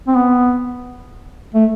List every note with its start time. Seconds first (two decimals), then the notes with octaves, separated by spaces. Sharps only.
0.08 C4
0.16 B3
1.55 A3